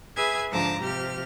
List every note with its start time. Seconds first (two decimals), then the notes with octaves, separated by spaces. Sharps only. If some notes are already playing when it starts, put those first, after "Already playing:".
0.16 G#4 B4 E5 G#5 G#6
0.51 G#2 D3 F3 A5 A#5 D6
0.81 C3 F3 G4 F6